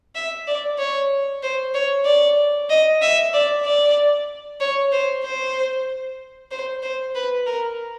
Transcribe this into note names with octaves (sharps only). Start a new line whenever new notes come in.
E5
D5
C#5
C5
C#5
D5
D#5
E5
D5
D5
C#5
C5
C5
C5
C5
B4
A#4